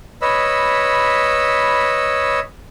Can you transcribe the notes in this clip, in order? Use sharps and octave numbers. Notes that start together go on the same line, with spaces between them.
B4 C#5 D#5 B5 E6